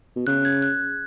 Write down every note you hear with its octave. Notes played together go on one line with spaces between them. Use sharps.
B2
C#3 F#6
G#6
F#6